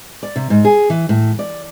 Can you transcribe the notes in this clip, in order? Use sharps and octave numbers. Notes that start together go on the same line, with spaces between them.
D5
C3
G#2
G#4
E3
A2
D5